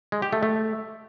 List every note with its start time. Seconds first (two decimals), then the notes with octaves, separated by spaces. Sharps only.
0.12 G#3
0.22 G4
0.33 A3
0.43 A3